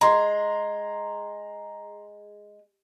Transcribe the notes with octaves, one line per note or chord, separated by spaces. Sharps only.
G#3 A#5 C6